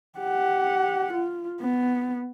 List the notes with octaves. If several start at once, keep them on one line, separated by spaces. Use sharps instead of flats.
G4 F#5
F4
B3